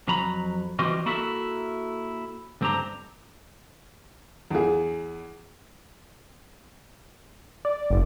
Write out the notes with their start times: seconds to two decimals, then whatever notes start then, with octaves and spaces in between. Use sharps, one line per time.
0.08 F2 F#3 A#5 B5
0.79 E3 G3 C4 F4 F#4 D#5
1.06 A#3 E4 F#4 A4 E5
2.61 D2 G2 C4 D4 G4 A#5
4.51 E2 G#4
7.65 D5
7.90 F#1